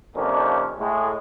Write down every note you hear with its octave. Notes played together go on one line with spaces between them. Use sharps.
F2 C3 D#3 A#3 C#4 D4
A2 G#3